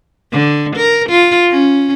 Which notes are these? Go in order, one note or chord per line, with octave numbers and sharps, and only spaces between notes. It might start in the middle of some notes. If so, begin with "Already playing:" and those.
D3
A#4
F4
C#4